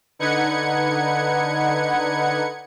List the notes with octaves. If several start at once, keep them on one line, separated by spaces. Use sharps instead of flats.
D3 D#4 B4 F#5 G#6 C#7